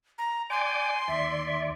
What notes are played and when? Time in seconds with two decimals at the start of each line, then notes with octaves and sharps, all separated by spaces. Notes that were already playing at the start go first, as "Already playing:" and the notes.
0.18 A#5
0.50 D5 G5 G#5 C6 D6
1.08 D#2 D5 E5